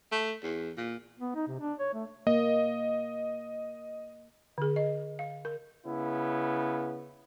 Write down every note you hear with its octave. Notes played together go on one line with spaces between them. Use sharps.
A3
E2
A#2
B3
D#4
C3
D4
C#5
A3
A#3 D#5
D3 G#4
D#5
F5
A#4
C#3 B3 E4